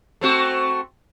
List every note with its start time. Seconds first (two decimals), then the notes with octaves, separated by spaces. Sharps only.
0.21 A3 C4 F#4